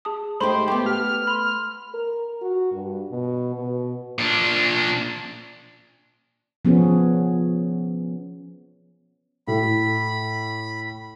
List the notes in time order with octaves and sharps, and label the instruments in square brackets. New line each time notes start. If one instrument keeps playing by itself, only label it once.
[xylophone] G#4 A5 D#6
[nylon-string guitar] A3 D#4 G4 [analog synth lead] C5 [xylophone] B5 C6
[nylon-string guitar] A3 B3 [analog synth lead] G4
[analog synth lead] F6
[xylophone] B5 C6
[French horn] A#4
F#4
G2
B2
B2
[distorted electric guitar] A#2 D4
[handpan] F3 B3 C#4 G#4
[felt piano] A2 [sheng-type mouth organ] B5